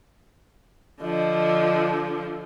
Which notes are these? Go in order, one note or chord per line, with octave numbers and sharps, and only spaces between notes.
D3 F3 D#5